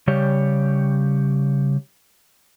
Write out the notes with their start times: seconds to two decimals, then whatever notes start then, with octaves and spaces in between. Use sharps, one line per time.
0.07 C#3 G3 G4 C#5